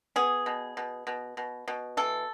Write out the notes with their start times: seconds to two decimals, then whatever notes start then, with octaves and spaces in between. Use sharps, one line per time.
0.16 B3 G#4
0.46 B2
0.77 B2
1.07 B2
1.37 B2
1.68 B2
1.97 E3 A4